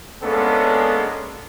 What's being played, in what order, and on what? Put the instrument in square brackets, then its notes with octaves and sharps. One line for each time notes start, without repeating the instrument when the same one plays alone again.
[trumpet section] G#3 A#3 B3 C#4 D4 A4